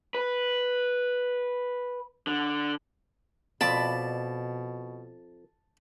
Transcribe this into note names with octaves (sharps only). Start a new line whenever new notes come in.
B4
D3
F2 B2 D5 A5 B5